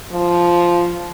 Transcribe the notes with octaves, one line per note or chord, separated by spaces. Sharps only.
F3